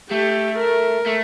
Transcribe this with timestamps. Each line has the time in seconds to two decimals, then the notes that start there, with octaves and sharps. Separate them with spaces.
0.11 A3 G4
0.59 A#4
1.06 A3